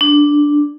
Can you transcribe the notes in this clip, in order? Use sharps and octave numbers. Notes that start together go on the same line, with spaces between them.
D4